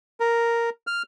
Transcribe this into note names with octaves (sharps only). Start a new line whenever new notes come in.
A#4
F6